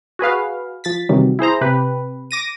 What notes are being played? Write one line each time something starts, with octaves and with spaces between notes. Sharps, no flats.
F#4 G#4 B4 F5
F3 A6 B6
C3 D#3 E3 F#3 G3
E4 G#4 C5 A#5
C3 G4 B4
D6 A#6 D#7